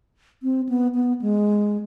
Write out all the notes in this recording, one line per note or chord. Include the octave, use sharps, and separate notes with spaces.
C4
B3
B3
G#3